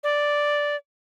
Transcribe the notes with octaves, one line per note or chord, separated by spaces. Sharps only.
D5